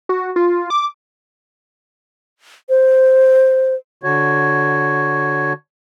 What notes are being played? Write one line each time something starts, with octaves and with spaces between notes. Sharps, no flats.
F#4
F4
D6
C5
D3 F#4 C#5